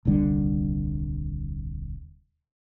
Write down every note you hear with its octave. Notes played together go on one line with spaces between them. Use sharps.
D#1 C2 D3 G3